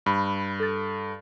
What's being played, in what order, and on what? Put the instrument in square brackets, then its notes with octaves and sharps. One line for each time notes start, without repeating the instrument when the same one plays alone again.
[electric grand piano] G2 [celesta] B5
[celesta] A4 A6